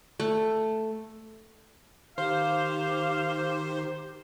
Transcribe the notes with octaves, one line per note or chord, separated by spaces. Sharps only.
A3
D#3 G4 C5 F5